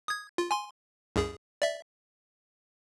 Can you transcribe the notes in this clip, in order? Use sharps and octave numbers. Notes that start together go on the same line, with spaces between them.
D#6 G#6
F4
G#5 C6
C2 F#2 G#4
D5 E5